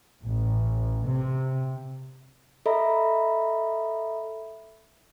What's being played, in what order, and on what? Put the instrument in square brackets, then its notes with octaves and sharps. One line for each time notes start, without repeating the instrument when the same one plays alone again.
[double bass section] A1
C3
[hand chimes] A4 D#5 E5 A#5 B5